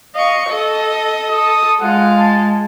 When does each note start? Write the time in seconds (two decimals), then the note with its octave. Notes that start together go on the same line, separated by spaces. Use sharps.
0.15 D#5 F5 C#6
0.50 A4 D#5
1.31 A4 D#6
1.81 G#3 F4 F5 F#5
2.19 A5